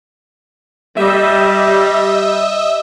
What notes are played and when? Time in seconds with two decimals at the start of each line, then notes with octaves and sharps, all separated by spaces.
0.97 G3 D#5 E5